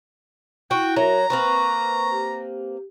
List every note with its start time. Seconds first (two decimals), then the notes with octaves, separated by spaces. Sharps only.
0.71 E4 F#4 G5
0.96 F#3 F#4 A#4 E5 A#5
1.30 A#3 C4 B4 C#6
2.11 G4